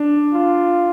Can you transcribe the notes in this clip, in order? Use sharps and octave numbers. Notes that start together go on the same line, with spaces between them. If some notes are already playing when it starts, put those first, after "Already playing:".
Already playing: D4
F4